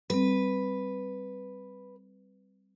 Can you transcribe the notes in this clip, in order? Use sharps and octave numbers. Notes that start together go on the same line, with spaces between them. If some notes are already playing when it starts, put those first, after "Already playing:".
G3 C4 B4